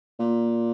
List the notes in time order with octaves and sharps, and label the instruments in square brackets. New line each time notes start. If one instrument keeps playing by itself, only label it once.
[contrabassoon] A#2